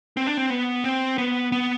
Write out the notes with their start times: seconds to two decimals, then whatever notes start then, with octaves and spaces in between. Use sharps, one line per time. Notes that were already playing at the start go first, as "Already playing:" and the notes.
0.17 C4
0.27 D4
0.37 C4
0.50 B3
0.84 C4
1.18 B3
1.52 B3